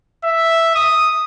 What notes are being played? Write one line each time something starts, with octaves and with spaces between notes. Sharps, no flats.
E5
D#6